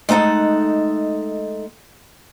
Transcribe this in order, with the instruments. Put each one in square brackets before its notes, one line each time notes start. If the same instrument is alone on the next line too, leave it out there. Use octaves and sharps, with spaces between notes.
[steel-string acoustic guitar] G#3 A3 D#4 A4 F#5